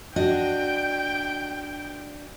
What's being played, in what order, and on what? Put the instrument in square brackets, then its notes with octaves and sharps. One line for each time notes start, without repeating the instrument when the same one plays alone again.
[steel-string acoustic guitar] D4 F#4 D#5 [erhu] G5